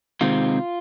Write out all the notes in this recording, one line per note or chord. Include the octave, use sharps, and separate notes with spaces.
C3 D#3 G#3 C4 F4